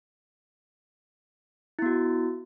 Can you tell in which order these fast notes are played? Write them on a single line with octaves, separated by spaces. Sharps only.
E4 B3 F#4